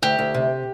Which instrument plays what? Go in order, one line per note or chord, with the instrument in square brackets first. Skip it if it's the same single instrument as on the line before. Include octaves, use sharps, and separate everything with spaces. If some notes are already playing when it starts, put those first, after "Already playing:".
[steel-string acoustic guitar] D2 [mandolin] G4
[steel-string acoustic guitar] D2
C3